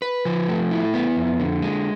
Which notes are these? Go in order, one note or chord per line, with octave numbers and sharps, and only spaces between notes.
B4
F3
A3
E4
B3
F2
D3
G#3